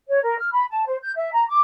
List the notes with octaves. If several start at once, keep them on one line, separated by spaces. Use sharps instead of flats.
C#5
A#4
F6
B5
A5
C5
G6
E5
A#5
D6